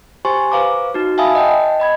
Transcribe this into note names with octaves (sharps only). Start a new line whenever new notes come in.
G4 C5 G#5 C6 C#6
B4 C5 F5 A#5 D6
D#4 F#4
E5 F5 G#5 A5 B5 D#6
D#5 F#5 G5 A5
D#5 B5 G#6